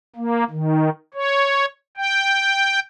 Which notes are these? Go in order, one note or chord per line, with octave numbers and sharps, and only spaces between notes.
A#3
D#3
C#5
G5